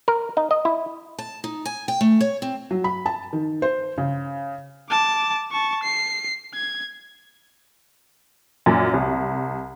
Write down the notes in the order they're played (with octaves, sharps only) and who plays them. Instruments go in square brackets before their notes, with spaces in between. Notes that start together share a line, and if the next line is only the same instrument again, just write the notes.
[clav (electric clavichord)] A#4
D#4
D#5
E4
[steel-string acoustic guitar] A5
D#4
G#5
G5
A3
C#5
C4
[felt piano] F#3
B5
A5
D#3
C5
C#3
[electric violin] A5 D6
A5 C#6
C7
G#6
[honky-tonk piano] F#2 A#2 G#5
C2